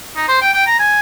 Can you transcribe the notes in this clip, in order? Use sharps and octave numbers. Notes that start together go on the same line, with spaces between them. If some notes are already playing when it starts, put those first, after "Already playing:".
D#4
C5
G5
G5
A#5
G#5